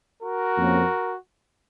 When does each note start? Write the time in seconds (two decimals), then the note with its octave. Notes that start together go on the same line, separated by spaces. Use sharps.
0.23 F#4 A#4
0.58 F2 F3 A#3 C#4